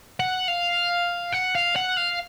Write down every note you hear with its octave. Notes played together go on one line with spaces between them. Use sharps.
F#5
F5
F#5
F5
F#5
F5